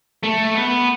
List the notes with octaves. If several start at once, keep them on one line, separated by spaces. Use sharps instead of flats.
A3
B3